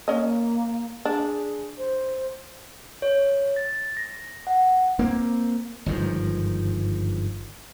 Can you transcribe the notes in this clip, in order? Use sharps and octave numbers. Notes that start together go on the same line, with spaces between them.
A#3 C#4 D#5
D4 G#4
C5
C#5
A6
A#6
F#5
A#3 C4
G1 G#2 D#3 F3